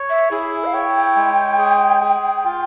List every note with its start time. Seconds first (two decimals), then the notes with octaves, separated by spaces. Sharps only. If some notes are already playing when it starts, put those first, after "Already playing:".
Already playing: C#5
0.10 E5
0.31 E4 G#4
0.65 F5
0.73 C#5 G5
1.16 G#3
1.58 G#4
2.02 G#4
2.44 F4